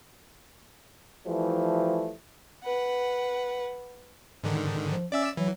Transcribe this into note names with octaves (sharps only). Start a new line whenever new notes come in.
E3 F3 G3 A3
B4 F#5
G#2 D3 D#3
F3
C#4 D5 E5 E6
E3 F#3